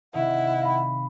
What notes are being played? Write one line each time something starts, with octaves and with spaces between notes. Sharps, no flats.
C3 D#3 E4 F#5
F5 B5